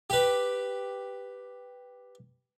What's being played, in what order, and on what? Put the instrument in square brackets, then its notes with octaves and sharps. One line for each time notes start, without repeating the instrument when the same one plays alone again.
[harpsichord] G4 B4